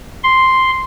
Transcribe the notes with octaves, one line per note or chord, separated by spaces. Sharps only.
C6